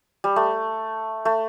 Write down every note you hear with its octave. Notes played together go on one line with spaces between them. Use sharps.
G3
A3
A3